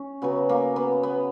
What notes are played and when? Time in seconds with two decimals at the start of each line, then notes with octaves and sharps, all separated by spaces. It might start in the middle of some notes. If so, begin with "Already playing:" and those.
Already playing: C#4
0.22 C#3 F#3 B3
0.49 A#3
0.76 B3
1.03 B3